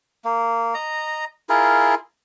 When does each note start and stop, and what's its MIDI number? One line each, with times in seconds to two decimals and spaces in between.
0.25 0.74 58
0.74 1.25 75
0.74 1.25 82
1.49 1.95 64
1.49 1.95 65
1.49 1.95 68
1.49 1.95 70